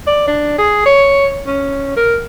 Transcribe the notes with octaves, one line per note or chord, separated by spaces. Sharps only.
D5
D4
G#4
C#5
C#4
A#4